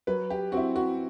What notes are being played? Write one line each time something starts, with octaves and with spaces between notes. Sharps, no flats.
F#3 B4
G4
C4 E4 F#4
F#4